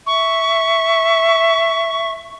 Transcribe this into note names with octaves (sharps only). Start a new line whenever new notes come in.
E5 C#6